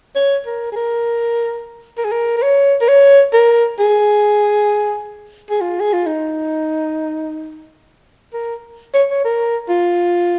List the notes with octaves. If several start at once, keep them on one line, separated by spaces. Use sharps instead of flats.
C#5
A#4
G#4
A#4
A#4
G#4
A#4
A#4
C#5
A#4
C#5
A#4
G#4
G#4
F4
G#4
F4
D#4
A#4
C#5
C#5
A#4
F4